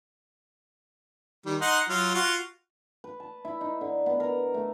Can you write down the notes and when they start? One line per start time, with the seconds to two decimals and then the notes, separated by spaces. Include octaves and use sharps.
1.46 D#3 G3
1.61 D#4 F#5 C6
1.89 F#3 F4
2.15 F4 F#4
3.04 B4
3.20 A5
3.45 E4
3.61 D#4
3.81 D3
4.06 B3
4.20 A#4
4.54 A3